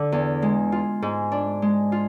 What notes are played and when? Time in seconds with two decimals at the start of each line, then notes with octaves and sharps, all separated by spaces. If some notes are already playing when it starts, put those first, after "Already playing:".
Already playing: D3
0.12 E2
0.42 G#3
0.72 F4
1.02 G#2
1.32 D4
1.62 G#3
1.92 F4